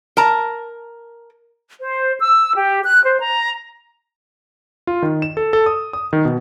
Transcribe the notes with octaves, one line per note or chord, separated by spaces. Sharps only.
A#4 A5 A#5
C5
E6
G4
F#6
C5
A#5
F4
D#3
E7
A4
A4
D#6
D#6
D#3
B2